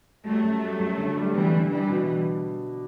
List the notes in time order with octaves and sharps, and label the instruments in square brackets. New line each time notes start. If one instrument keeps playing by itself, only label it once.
[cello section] F#3 A3 [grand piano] G3
[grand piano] F#2
G3
F#2
D3
G3
[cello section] E3 G3 [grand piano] B3
[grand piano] D3
[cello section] E3 G3 [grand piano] D4
[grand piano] B2